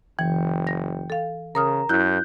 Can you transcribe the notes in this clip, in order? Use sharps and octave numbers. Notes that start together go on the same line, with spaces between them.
F#1 E3 G5
A#6
A4 F5
C#3 A#4 A#5 D#6 F6
F#2 E4 F#6 G6